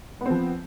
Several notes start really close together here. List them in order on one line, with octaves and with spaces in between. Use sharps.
B3 C4 F3